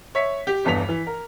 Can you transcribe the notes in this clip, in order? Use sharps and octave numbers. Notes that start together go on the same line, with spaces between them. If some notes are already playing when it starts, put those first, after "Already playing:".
C#5 E5 B6
G4
G1 E2 G2 B3 B6 F7
E3
A#4